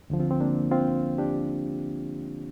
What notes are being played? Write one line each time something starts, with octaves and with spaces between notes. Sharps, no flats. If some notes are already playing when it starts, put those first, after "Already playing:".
D2 D3 F3
C4 F4
C4
A#3 D4
C4 F4
D4 G4